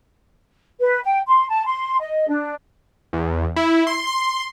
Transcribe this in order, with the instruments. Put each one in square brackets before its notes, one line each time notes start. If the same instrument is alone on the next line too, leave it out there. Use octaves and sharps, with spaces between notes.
[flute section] B4
G5
C6
A5
C6
D#5
D4
[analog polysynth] E2
E4
C6
C6